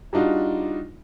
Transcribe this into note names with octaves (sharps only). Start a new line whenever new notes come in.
G3 D4 D#4 F4 F#4